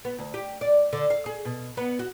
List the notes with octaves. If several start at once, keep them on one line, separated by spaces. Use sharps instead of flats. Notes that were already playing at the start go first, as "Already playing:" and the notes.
B3
D2
G4
D5
D3
F5
G#4
B2
B3
F#4